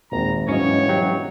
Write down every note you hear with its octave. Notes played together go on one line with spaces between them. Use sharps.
G#1 D#2 A#2 A#5
E1 G#2 F#3 C#4 C#5 D#5
F#3 G4 F#5 G5